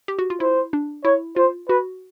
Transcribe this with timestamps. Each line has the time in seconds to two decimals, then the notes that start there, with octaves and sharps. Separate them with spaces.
0.08 G4
0.19 F#4
0.30 F4
0.40 E4 C5
0.73 D4
1.05 E4 C#5
1.36 F4 C5
1.68 F#4 B4